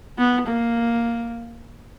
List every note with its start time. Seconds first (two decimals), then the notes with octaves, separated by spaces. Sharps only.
0.18 B3
0.47 A#3